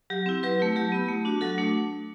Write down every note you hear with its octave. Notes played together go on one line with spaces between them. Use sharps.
F#3 G4
C4 E4
F#3 G4 B4
A3 E4
F#3 G4
B3 E4
A3
D4 F#4
F#3 F#4 A4
A3 D4